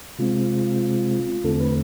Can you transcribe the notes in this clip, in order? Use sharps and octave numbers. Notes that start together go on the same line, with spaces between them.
C3 G#3 C4 F4
E2 D3 A3 C4 A4
B4